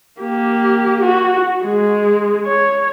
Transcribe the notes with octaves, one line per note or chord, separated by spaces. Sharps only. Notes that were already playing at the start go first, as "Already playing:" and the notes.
A#3 G4
F#4
G#3
C#5